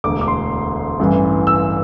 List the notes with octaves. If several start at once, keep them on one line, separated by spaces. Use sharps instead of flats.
E1 D2 D3 D6
D6
C6
A1 G2 E3
E6